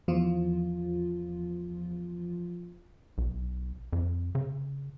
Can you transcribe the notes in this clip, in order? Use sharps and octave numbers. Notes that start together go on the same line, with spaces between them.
E2 F3 F4
B1
F2
C#3